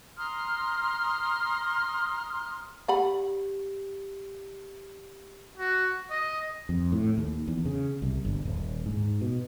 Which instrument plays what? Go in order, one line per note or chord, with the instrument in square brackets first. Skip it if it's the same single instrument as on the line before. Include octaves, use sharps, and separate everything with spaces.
[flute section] A#5 C6 D#6 F6
[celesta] G4 [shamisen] D5 F#5 B5
[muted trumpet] F#4
D#5
[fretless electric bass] F2
A2
D#2
E2
C#3
C2
G1
D#1
G#2
B2